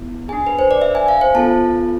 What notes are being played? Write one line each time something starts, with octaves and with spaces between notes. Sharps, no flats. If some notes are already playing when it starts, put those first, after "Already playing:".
Already playing: B3 E4
D4 G#4 G#5
B4
C5
D5
E5
G#5
F5
C5
B3 F4 A4 A5